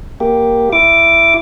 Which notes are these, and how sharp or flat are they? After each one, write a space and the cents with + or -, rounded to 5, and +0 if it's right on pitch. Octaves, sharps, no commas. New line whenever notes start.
A#3 +0 G4 +0
E4 +15 D6 -5